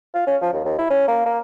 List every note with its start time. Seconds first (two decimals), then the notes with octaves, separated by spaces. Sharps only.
0.15 F4
0.27 C#4
0.42 F3
0.53 D#2
0.65 D#2
0.78 E4
0.90 C#4
1.08 A#3
1.26 A#3